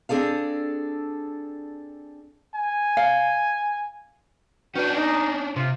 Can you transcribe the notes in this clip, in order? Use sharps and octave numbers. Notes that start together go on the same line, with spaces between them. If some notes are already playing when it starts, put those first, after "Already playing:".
C4 D4 G#4 A4 F5
G#5
F5
C#4 D4 F#4 B4 G5
D#4
C3 F4